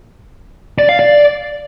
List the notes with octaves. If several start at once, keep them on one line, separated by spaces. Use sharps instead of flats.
D5
F5
D5